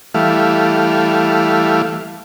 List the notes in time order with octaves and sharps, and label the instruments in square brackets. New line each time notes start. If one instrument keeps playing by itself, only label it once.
[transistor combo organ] E3 G3 A3 F5